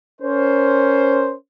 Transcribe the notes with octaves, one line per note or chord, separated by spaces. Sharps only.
C#4 A#4 C5